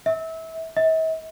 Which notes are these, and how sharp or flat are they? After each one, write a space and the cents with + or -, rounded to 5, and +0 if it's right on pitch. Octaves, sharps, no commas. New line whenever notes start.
E5 -25
E5 -45